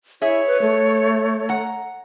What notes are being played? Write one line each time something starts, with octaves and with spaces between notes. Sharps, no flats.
E4 G#4 C#5 E5
B4
A3
F#5 A#5